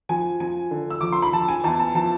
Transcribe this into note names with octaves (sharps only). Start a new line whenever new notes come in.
F3 G#5
F3 G#5
D3
E6
F3 D6
C6
B5
F3 A5
G#5
E2 A5
A5
F3 A5